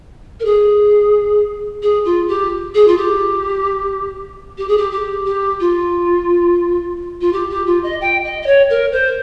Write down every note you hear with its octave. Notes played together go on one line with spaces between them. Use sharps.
A#4
G#4
G#4
F4
G4
G#4
F4
G4
G4
G#4
G4
G4
G4
F4
F4
G4
G4
F4
D#5
G5
D#5
D#5
C#5
A#4
C5